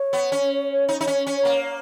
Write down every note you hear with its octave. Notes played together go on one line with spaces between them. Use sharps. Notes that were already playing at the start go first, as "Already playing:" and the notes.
Already playing: C#5
B3
C#4
D#4 C#5
D#4
C#4
C#4
A#3